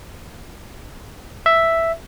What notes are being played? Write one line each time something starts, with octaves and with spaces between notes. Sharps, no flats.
E5